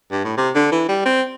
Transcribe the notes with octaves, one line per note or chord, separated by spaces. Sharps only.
G2
A2
C3
D3
E3
G3
C4